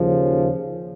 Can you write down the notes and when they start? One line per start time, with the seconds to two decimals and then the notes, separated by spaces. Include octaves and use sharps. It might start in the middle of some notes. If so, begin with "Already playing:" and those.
Already playing: D#2 C#3 F3